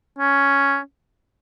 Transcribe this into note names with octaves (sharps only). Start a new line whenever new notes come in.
C#4